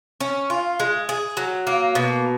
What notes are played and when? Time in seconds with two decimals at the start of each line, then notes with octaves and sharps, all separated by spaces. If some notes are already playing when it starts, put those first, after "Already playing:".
0.20 C#4
0.50 F4
0.80 G#3
1.09 G#4
1.37 F#3
1.67 A#3
1.95 B2